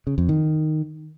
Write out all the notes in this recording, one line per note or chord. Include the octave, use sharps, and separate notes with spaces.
C#3
F2
D#3